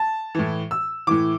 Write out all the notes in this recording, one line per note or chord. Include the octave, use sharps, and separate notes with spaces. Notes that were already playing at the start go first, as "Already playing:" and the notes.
Already playing: A5
A2 E3
E6
A2 E3 D6